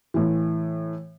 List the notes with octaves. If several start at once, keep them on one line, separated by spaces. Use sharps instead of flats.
A2 E3